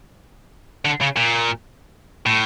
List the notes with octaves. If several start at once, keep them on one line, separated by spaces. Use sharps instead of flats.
D3
C#3
A#2
A2